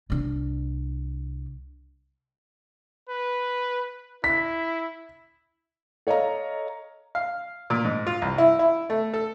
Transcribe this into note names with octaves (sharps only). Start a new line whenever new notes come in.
C2 D4
B4
E4 B6
A4 C#5 D#5 F5 A#5
F5
A#2
G#2
F4
C2
E4
E4
A3
A4